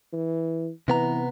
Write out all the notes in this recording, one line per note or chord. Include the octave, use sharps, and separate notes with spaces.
E3
C3 E3 B3 A#5